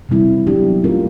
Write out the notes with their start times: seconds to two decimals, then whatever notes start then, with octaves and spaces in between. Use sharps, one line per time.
0.09 C3 E3 G3 C4 E4
0.47 F#3 B3 D4 G4
0.84 A3 C#4 F4 A#4